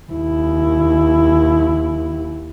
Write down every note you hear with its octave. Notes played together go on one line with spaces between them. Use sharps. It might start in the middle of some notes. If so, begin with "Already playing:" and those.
D#2 E4